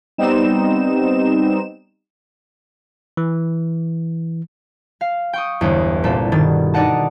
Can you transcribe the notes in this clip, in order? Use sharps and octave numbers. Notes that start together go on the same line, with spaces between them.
G3 B3 C4 D#4 E7
E3
F5
G5 C#6 D#6
G1 E2
C2 A#2 A#3 A4
G2 B2 D#3 A6
D4 D#4 D5 D#5 F#5 A5